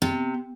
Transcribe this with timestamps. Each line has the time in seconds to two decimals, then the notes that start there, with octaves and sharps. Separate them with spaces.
0.02 C3